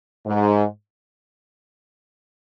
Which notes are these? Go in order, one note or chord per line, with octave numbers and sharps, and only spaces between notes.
G#2